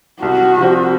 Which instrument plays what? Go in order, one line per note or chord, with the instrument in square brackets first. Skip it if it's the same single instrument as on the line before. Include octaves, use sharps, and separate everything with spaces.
[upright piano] C2 [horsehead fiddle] F#4
[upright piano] C3 F3 C4